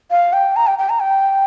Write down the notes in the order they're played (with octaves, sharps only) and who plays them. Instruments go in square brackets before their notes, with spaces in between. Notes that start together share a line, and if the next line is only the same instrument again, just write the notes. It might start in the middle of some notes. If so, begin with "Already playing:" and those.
[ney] F5
G5
A#5
G5
G5
A#5
G5